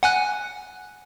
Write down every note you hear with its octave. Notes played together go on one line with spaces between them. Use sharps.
F#5 G#5 F#6